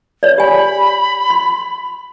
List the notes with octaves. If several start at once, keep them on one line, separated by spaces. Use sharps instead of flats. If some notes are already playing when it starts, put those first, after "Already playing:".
C#5 D5
G4 G#5 B5
C6